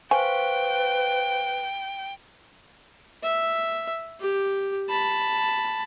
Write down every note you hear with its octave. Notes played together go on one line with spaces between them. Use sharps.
B4 C5 F5 G5 G#5 C#6
E5
G4
A5 B5